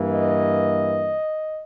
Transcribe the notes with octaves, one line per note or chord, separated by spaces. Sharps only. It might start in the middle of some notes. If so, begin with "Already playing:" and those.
Already playing: G2 E3 A#3
D#5